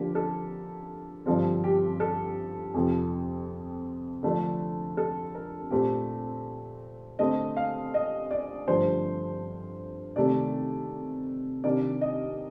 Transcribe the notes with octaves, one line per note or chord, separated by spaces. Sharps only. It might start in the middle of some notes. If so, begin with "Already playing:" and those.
Already playing: D3 F3 A#3 D4 G4
A4
G2 D3 F3 C4 A4
G4
A4
F2 C3 F3 C4
D3 F3 A3 D4
A4
A#4
A#2 A3 C4 G4
D3 A3 C4 D#5
F5
D#5
D5
G2 D3 F3 A3 D4 C5
C3 D#3 A3 D5
C3 D#3 A#3 D4 D5
D#5